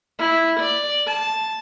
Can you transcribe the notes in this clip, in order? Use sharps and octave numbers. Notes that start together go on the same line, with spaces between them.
E4
D5
A5